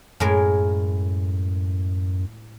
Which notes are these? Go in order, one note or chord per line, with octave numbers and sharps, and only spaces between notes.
F#2 A2 G#3 A#4